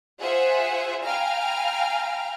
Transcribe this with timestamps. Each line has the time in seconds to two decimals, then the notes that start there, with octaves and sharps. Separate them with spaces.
0.21 F4 G#4 C5 E5 F#5 G#5
1.05 F5 G5 G#5 A#5 B5 F6